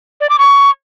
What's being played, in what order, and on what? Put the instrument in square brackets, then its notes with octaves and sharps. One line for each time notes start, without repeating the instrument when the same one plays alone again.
[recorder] D5
D6
C#6